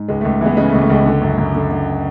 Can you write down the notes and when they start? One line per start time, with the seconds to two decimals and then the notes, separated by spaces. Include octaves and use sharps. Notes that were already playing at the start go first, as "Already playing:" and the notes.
Already playing: G#2
0.08 C#2 G#3
0.21 C#2 A3
0.41 E3 G#3 B3
0.57 C#3 G#3 B3
0.69 A3
0.74 C#2
0.81 A3
0.90 C#2 G#3
1.06 D3
1.21 F#2
1.38 F#2
1.55 D3
1.71 D3